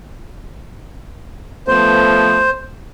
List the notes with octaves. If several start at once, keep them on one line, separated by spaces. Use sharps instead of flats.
F3 A3 B3 C5